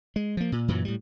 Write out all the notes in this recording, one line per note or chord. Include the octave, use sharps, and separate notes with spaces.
G#3
F3 A#3
A#2
F#2 A#2 E3 F#3
A2 G3